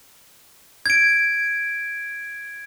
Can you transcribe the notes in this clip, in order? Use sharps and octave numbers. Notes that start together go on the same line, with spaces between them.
G#6 D7